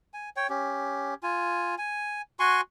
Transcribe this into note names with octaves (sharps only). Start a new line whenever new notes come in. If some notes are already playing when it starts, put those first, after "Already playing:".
G#5
C#5 G5
C#4 G4
F4 G#5
G#5
F#4 G#5 C6 C#6